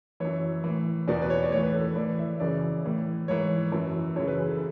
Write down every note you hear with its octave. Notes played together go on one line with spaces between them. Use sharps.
F#2 E3 C#5
A2 E3
E2 B2 D5
B4
C#5
D5
A2 E3 C#5
B4
A4
A2 E3 D5
E5
F#2 C#3 E3 D5
A2 E3
G#2 E3 C#5
F#2 E3
F#2 C#3 E3 C#5
B4
G#4
A4